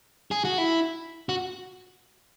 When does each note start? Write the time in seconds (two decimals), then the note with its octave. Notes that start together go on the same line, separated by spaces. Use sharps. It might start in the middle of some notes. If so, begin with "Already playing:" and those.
0.31 G#4
0.44 F#4
0.58 E4
1.29 F#4